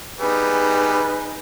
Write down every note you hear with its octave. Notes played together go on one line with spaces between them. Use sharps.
G3 B3 D#4 G#4 B4